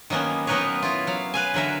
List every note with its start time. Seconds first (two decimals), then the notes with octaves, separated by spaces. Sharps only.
0.10 D#3 F#3 A#3 B3 C#4
0.47 F#3 B3 D#4 A#4 B4 C#5
0.83 E4 F4
1.07 F#3 F5
1.34 B4 F5 G#5
1.54 D3 F#3 A#4 E5